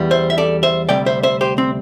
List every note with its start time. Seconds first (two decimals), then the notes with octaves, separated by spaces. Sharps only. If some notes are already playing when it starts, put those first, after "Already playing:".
Already playing: E2 E3 G3
0.11 C5 E5
0.30 E5
0.38 A4 D5
0.63 C5 E5
0.89 D2 C3 G3 D5 G5
1.06 C5 E5
1.23 C5 E5
1.41 G4 C5
1.58 C4